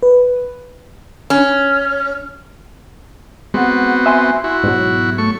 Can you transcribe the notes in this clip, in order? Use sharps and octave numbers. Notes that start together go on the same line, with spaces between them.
B4
C#4
G#3 B3 C4 F#4 F#5
E5 G#5 C6
E4 F#4
G#2 B2 F#3
A3 C#6